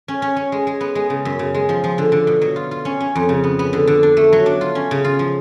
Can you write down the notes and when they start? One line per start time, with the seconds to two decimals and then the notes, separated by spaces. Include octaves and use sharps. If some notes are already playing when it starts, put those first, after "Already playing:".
0.08 C#4
0.22 C#4
0.36 C#4
0.52 G#3
0.67 G#3
0.81 B3
0.95 G#3
1.10 C#3
1.25 F#2
1.39 C#3
1.54 G#3
1.69 F3
1.84 F3
1.98 D3
2.12 D3
2.27 B2
2.41 F#3
2.56 F4
2.71 F4
2.85 C#4
3.00 C#4
3.16 F2
3.29 C#3
3.44 B3
3.59 B3
3.73 D3
3.87 D3
4.03 D4
4.17 A3
4.33 F#3
4.46 D4
4.61 F4
4.75 C#4
4.91 C#3
5.04 F4
5.19 F3